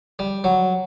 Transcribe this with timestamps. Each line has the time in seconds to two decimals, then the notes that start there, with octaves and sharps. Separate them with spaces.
0.19 G3
0.44 F#3